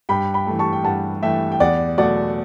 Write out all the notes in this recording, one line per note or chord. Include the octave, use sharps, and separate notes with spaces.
G2 G5 B5
G5 B5
E3 A3
A5 C#6
G5
G2 F#5 A5
E3 A3 E5 G5
G5
E2 D5 F#5
B2 F#3 A3 D5 F#5